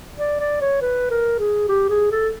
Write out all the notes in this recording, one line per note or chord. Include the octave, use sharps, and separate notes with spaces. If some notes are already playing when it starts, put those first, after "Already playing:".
D5
D5
C#5
B4
A#4
G#4
G4
G#4
A4